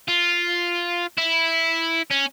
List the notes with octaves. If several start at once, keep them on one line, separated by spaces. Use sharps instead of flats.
F4
E4
C#4